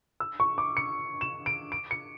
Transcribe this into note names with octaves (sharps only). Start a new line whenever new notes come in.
E6
C#6
D6
C#7
E7
D7
D7
C#7